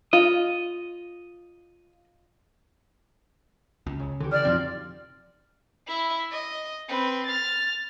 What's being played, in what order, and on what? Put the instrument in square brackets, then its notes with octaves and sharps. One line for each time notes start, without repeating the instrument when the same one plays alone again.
[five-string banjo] F4 [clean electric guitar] D#5
[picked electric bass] C#2
[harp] C#3
[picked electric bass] D3 [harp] E3 F#4 G4
[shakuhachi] D5 [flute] F6 [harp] D7 E7
[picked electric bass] F2 B2 C4 [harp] F3 D#4 F4
[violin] E4 E5
D#5
C4 B4
F6 A6